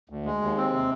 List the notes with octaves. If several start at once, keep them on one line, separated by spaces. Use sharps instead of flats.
D2
G#3
D#2
C4
C3